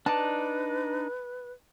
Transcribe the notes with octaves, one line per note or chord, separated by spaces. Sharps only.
D4 D#4 B4 D5 A5